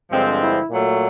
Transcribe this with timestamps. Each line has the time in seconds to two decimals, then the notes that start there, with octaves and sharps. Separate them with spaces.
0.11 G2 D3 F3 G#3 C4
0.41 E4
0.70 A#2 F#3 A3